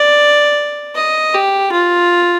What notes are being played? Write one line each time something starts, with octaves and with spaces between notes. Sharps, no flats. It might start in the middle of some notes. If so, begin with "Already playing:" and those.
Already playing: D5
D#5
G4
F4